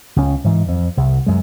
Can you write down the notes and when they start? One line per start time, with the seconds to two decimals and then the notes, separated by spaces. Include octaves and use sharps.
0.16 C#2 C#4
0.44 G#2 E3
0.68 F2
0.97 C2
1.26 F#2 G#3